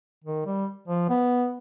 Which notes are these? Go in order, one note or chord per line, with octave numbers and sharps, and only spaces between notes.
D#3
G3
F3
B3